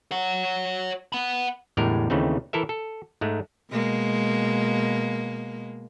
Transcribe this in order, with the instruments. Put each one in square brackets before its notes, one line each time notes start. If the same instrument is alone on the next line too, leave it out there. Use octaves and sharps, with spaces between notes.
[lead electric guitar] C#5 F#5
F#5 B5
[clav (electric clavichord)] E2 A2 D3 G3 G#3 A#4
D#2 C#3 E3 A3 C4 D#4
E3 E4 A4 A#4 E5
A4
G#2 G#3 A3
[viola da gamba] B2 G#3 A#3